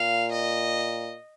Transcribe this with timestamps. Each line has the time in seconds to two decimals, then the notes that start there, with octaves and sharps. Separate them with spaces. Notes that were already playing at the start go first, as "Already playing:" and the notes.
Already playing: A#2 F5
0.32 D#5